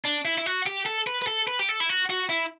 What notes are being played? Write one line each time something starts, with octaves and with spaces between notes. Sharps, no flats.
D4
E4
E4
F#4
G4
A4
B4
B4
A4
B4
G4
A4
E4
F#4
F#4
E4